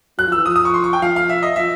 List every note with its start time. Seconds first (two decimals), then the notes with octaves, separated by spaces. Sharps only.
0.18 F#3 F#6
0.27 F3
0.32 E3 E6
0.46 F3 D#6
0.56 D#6
0.65 C#6
0.74 C6
0.84 C#6
0.93 G5
1.02 F3 F5
1.16 F5
1.29 E5
1.43 D#5
1.56 F3 E5